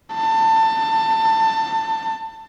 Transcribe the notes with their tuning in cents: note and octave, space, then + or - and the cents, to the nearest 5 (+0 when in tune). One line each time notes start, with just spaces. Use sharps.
A5 +25